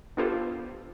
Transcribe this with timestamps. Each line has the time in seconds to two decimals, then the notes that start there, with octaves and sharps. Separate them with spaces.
0.17 B3 D4 F4 G4 A4 C5